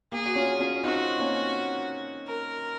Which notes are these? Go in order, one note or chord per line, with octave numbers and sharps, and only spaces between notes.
A#3 G#4
F#4
C#4 F4
C#4 F4
C4 D#4 F#4
A#3 C#4
A#4